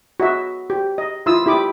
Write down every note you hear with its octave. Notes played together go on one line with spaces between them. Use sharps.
F#4 D#5 E5
G4
D#5
E4 F4 D#6 E6
E4 G4 B5 D6 D#6